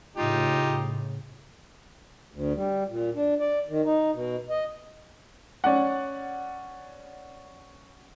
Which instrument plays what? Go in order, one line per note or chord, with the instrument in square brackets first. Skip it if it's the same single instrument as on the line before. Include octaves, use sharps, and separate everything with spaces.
[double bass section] A2 C#3 [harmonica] D#4 G4 [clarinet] F4
[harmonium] D2
G3
A#2
D4
D5
D#3
D#4
B2
D#5
[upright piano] C#4 D5 F#5